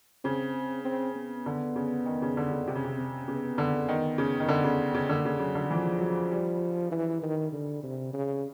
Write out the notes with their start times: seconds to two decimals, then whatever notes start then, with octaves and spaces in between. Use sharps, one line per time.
0.24 C#3 C4
0.84 C4
1.16 B3
1.46 D3
1.76 C#3
2.06 D#3
2.22 C#3
2.37 D3
2.51 C#3
2.67 C3 C4
2.75 C#3
2.84 C3
2.97 C4
3.28 C#3 B3
3.58 D3
3.88 D#3
4.18 C#3
4.40 D#3
4.49 D3
4.64 C#3
4.94 C#3
5.09 D3 A#3
5.25 C#3
5.39 C#3 F#3
5.55 D3
5.70 E3 F3
6.00 F#3
6.32 G3
6.91 E3
7.22 D#3
7.52 D3
7.83 C3
8.13 C#3